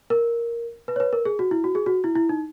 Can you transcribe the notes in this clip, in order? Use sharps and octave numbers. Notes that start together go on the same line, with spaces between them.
A#4
B4
C#5
B4
A#4
G#4
F#4
E4
F#4
G#4
F#4
E4
E4
D#4